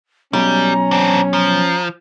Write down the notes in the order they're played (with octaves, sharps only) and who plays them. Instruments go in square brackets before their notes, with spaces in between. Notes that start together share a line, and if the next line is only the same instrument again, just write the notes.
[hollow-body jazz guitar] B1 [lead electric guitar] G3 [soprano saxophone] C#4 [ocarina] A#5
[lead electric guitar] C4 D4
[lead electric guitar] F3 [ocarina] A#5